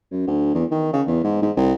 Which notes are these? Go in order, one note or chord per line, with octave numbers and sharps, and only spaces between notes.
F#2
D2
E2
D#3
C#3
E2
G#2
G#2
C2